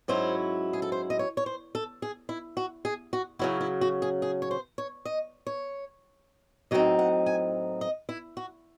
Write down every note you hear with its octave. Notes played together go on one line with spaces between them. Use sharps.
G#2 F#3 C#4 E4 C5
G#4
A4
C5
D#5
C#5
C#5
C5
A4
G#4
E4
F#4
G#4
F#4
C#3 F#3 C#4 E4 F#4
E4
F#4
G#4
G#4
C#5
C5
C#5
D#5
C#5
A2 F#3 C4 D#4 D#5
F#5
G#5
D#5
E4
F#4